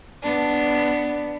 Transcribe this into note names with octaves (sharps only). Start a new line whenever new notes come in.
B3 D4